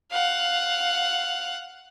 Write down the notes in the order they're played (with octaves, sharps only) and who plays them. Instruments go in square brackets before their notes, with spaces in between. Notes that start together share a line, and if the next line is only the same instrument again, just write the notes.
[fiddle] F5 F#5